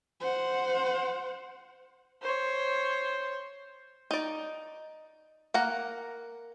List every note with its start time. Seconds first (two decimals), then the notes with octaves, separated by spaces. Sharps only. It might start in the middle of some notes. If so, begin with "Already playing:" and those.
0.20 C5 F#5
2.22 C5 C#5
4.11 D#4 D5
5.54 A#3 F#5 A#5